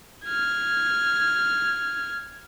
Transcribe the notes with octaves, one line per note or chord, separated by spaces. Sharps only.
F6 G#6